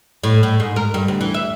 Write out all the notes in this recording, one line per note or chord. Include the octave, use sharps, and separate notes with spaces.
A2
A2
G#2
A#4
G2
D2
E3
E5